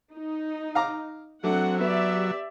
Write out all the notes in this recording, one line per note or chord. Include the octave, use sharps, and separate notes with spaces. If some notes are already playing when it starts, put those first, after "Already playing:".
D#4
F5 A#5 D6
F#3 A3 C4 D4 F#5
B3 G4 D5 E5